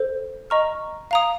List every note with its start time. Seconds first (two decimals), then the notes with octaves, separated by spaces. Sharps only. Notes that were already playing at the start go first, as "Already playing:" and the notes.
Already playing: A4 C5
0.50 D#5 A#5 C#6 F6
1.11 F5 A#5 D#6